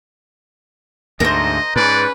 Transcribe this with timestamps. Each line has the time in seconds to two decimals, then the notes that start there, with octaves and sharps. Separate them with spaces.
1.20 D2 G#2 A#4 C5 D#5
1.76 G#2 C#4 B4 D5